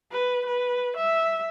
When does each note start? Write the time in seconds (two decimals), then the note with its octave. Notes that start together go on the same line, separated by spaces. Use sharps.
0.12 B4
0.47 B4
0.97 E5